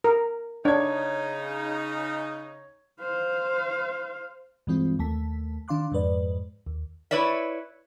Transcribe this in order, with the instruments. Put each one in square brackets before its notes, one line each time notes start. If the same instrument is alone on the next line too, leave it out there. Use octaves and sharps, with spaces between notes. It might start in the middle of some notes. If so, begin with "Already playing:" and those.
[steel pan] A#4
[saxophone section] C#3 D#4 [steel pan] D4 [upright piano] C#5 G#6
[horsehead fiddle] C5 F5
[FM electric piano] G2 E3 G#3 C4 F4
D#2 A3 A5 B6
D#3 D4 F5 C6 D6 F#6
F2 G#2 G#3 B4 D5
D#2
[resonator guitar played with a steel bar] E4 B4 C#5 D5 E5